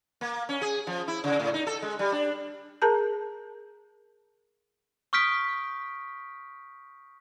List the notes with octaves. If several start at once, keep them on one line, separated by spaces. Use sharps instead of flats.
A#3
C#4
G#4
F3
E4
C#3
A2
D#4
A4
G#3
G3
D4
G#4 A#4 A5 A#5 G6
C#6 D#6 F6 G6 B6 D7